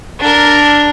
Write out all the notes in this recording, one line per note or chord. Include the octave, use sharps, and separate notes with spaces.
D4 A#4